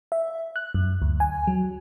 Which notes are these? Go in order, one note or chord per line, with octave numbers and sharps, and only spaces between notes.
E5
F#6
F#2
D2
G#5
F#3